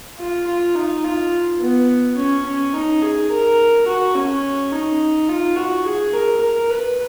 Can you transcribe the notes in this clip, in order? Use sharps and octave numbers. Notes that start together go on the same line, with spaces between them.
F4
F4
D#4
F4
B3
C#4
C#4
D#4
G#4
A#4
F#4
C#4
D#4
F4
F#4
G#4
A#4
A#4
B4